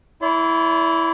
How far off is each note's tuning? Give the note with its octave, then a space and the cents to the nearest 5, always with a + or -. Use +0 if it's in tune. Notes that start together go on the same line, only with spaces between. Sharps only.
E4 +0 D5 -45 C6 -40